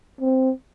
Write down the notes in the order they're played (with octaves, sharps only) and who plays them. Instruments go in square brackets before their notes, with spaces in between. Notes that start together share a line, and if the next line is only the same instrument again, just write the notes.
[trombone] C4